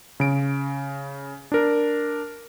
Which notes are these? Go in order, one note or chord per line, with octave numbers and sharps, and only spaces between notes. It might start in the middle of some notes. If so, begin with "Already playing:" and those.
C#3 D7
D4 A#4